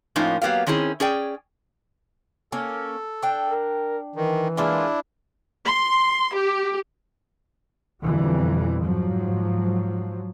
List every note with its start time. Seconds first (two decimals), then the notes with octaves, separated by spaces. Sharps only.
0.16 A2 F3 A#3 C#4 D#4 F4
0.42 F#3 A#3 B3 G4 F5
0.67 D#3 C4 C#4 E4 G#4
1.00 C#4 G#4 D5 G5
2.52 A#3 C#4 A4
3.23 D4 G5
3.47 A#4
4.16 D#3 E3
4.57 G#3 A#3 D4 E4 F4
5.66 C6
6.33 G4
8.02 F2 B2 D3 E3 G3
8.82 G#2 F3 F#3